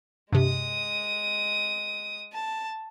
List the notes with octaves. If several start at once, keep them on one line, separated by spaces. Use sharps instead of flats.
G2 C3 G#3 D#6
A5